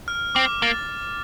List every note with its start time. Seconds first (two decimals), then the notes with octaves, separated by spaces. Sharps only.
0.08 F6
0.35 C4 D6
0.62 A#3 A6